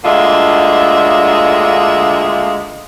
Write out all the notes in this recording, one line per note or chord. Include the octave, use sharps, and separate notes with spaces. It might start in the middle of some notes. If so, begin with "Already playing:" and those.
D2 D3 G#3 A#3 F4 E5